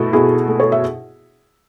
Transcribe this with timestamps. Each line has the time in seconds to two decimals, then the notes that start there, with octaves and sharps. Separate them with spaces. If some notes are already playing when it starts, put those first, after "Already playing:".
Already playing: B2 A3 E4 F#4
0.13 B2 E4 G#4
0.48 A3
0.60 A4 C#5
0.72 E5